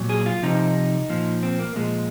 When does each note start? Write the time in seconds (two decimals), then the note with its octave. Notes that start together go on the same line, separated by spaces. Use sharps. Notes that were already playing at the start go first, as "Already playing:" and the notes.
Already playing: A#2 F#3
0.09 G#4
0.26 F4
0.43 C3 F3 D#4
1.10 A#2 F3
1.43 C4
1.59 A#3
1.76 A#2 F3 G#3